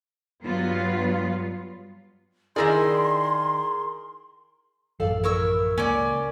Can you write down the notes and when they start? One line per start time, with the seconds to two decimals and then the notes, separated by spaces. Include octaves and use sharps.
0.43 G2 F#3 G3 B3 F4
2.56 D#3 E4 G#4 A#4 D5 C6 A#6
5.00 A1 F#2 F3 A4 D5 F5
5.24 E4 A#4 C#6 E6
5.78 C#2 A#3 C#4 D5